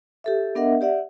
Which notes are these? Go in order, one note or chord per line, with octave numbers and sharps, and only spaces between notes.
G4 A4 E5
B3 D4 A#4 D#5 E5 F#5
G4 D5 E5 F#5